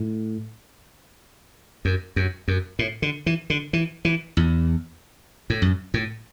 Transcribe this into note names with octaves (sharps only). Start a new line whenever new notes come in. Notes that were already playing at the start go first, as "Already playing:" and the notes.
Already playing: A2
F#2
F#2
F#2
A2
D3
E3
D3
E3
E3
E2
A2
F#2
A2